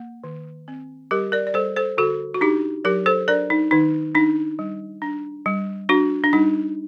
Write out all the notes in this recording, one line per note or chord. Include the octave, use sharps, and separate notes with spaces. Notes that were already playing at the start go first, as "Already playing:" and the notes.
Already playing: A#3
D#3
C4
G3 G4 A#4
A#4 D5
D5
G3 A4 C5
A4 C5
D3 F#4 A4
F#4
D4 D#4 G4
F#3 G4 A#4
A4 C5
D4 A#4 D5
D#4
D#3 D#4
D4 D#4
G3
D4
G3
D4 F#4
D4
G3 D#4